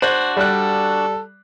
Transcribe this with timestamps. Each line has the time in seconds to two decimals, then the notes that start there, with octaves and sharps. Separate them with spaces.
0.02 D4 F#4 C5
0.37 G3 A4 D5 F#6